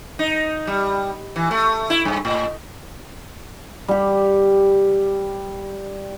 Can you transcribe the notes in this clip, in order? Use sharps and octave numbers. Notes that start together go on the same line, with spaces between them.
D#4
G3
E3
A3
E4
G2
A2
G3 G4